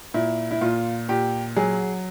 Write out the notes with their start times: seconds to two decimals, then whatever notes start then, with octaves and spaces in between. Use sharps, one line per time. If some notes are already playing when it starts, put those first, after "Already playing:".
0.14 A#2 E4
0.51 E4
0.61 A#2 F4
1.09 A#2 G4
1.56 F#3 G#4